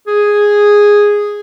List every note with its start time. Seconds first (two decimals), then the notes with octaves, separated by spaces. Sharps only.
0.07 G#4